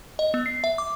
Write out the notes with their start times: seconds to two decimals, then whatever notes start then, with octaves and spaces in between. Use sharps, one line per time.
0.19 D#5
0.34 B3
0.46 C7
0.64 E5
0.78 D6